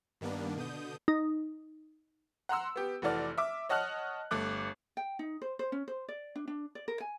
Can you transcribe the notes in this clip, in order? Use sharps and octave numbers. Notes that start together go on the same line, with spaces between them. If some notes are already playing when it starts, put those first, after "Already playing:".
G2 D#3 G3 A#3 B3 D4
B2 D3 D#6 G6
D#4
F#5 A#5 C6 E6
B3 G4
F1 E3 F#4 A4 D5 F6
E5 D6
C#5 D#5 F#5 A5 F6 F#6
G1 A3 D6 F#6
G5
D#4
C5
C5
C#4
C5
D5
D4
D4
D5
A#4
G#5